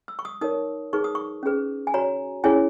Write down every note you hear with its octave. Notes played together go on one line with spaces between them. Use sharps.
E6
C#6
D#6
D#4 A#4 C#5 D#6
D#4 G#4 B4 C#6
D#6
C#6
C#4 G#4 B4
G#5
F#4 C#5 A#5
C#4 E4 G#4 C#5 G#5